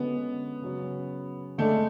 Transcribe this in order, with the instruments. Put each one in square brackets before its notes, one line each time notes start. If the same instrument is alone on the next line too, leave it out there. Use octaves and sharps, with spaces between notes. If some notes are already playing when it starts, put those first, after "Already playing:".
Already playing: [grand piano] D3 G#3 C#4 F#4 [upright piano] B3
[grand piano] C#3 F#3 C#4
[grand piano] D3 G#3 D4 [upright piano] A3